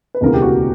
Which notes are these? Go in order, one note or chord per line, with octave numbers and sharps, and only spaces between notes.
B4
E1 D2 C#3 E3 A#4
G4
F#4